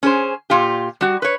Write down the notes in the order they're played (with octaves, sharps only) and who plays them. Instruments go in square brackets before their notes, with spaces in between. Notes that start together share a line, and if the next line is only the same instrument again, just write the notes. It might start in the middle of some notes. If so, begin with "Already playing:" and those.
[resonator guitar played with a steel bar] C#4 G#4 C5
A#2 F4 G4
G3 F#4
B4 C#5